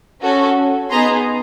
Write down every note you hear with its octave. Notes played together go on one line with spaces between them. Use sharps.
C#4 F#4 A4
B3 D#4 G#4 A#5 C6